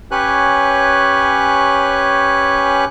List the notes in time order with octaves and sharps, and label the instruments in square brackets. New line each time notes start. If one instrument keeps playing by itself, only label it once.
[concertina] C#4 G4 B4 C#5 G#5 F#6